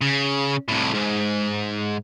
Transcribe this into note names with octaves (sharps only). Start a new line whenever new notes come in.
C#3
C2 A2
G#2